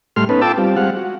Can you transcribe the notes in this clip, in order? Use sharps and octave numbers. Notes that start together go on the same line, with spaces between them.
A2 G3 A3 C6 F6
B3 C#4 D#4 A4 B4
F4 A4 G5 A5 D6 E6
G3 C4 F4
G3 G#3 C4 F5 F#5
F#4